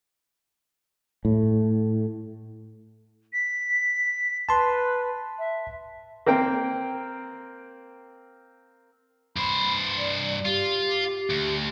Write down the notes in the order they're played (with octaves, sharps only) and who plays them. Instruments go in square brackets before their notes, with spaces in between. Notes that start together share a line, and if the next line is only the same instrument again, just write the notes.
[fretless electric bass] A2
[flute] B6
[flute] B4 [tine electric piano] A5 C6
[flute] E5
[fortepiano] A#3 C4 A#4 G5
[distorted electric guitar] G2 C5 [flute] B5
[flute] D5
[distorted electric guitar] F4 [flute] G4
[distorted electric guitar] D2